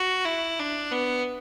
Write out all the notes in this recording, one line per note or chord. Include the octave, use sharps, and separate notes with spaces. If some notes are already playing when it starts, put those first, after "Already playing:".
Already playing: F#4
E4
D4
B3